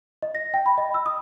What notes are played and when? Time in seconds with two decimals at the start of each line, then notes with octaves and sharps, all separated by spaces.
0.22 D#5
0.35 A#6
0.54 G5
0.66 B5
0.78 D#5
0.94 E6
1.06 D#6